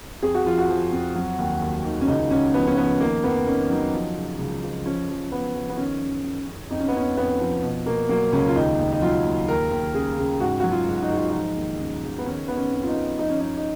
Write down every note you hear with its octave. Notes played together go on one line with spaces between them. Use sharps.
F2 G#4
F#4
F3 F4
F#4
F3
F2
F#3
D#2
D#2
D#3
C#4
C#2 D#4
C#2 C#4
F3 B3
C#4
F3 B3
D#3 A#3
F2 B3
D#3 C#4
F#3 D#4
F3
C#3
C#2
F3
F3 C#4
F3
F3 B3
F3
B3
D#3 C#4
F#2
F#2
F#2
F2 D#4
C#4
B3
F2 C#4
F2 B3
F3
B2
B2 A#3
F#3 A#3
C#2 C#4
F4
D#2 D#4
D#2
D#4
F#3 F4
D#2
D#2 A#4
D#2
C#3 G#4
C#3
G#2 F#4
F#3 F#4
F4
G#2
D#4
G#2
F4
F3 D#4
D#2
C#3
C#3
B3
D#3 C#4
D#3 B3
C#4
F2
F4
D#4
F2
F3 D#4
C#4
F#2 D#4
D#4